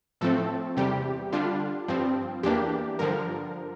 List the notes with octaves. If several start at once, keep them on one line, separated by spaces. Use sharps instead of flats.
A2 F3 A3 C4 A4
E2 C3 G3 G4
D3 G3 D4 F4
G2 F3 C4
E2 E3 A#3 D4 G4
G2 D3 F3 A#4